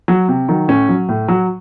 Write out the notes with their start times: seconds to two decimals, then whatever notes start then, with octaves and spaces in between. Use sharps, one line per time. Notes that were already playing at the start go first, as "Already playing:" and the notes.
0.08 F#3
0.28 C3
0.48 D#3 F#3
0.68 A2 C#4
0.89 F#3
1.09 A2
1.28 F#3